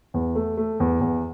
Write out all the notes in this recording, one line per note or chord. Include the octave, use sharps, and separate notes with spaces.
E2
A3
A3
E2
E2